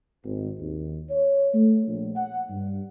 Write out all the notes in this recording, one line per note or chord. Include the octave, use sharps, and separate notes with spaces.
G#1
D#2
C#5
A3
A#1
F#5
G2